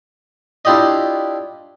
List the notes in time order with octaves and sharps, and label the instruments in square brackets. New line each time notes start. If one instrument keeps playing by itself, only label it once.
[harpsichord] D4 E4 F4 G4 D5 D#5